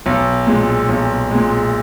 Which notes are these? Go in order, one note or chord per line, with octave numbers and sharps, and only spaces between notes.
B1
A#2 G#3
B1
A#2 G#3